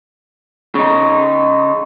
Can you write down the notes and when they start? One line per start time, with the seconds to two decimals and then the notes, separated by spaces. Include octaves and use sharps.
0.75 C#3 D#4